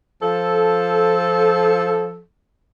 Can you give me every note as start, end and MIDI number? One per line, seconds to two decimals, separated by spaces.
0.22 2.21 53
0.22 2.21 69